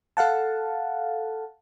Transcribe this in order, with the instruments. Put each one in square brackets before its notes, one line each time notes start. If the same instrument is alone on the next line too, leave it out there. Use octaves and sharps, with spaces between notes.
[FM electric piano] A4 F5 F#5 A5